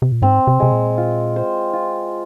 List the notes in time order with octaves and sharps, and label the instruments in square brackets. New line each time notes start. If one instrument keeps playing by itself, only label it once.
[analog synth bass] C3
A#2
[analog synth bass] G#2 [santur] C4
[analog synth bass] C3
[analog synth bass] C3 [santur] G#3
[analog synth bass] A#2
[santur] F4
C5
F4